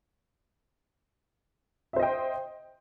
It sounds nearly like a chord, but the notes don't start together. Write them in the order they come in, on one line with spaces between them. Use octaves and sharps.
E5 C5 D#5 G5